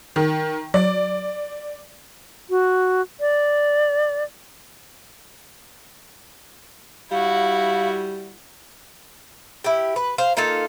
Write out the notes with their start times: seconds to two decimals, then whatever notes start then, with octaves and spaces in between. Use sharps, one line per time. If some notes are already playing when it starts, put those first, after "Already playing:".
0.16 D#3
0.74 F#3 D5
2.50 F#4
3.20 D5
7.11 G3 E4 F#4 F5
9.64 E4 G4
9.96 B4
10.18 C5 F5
10.37 A#3 D#4 F4 A4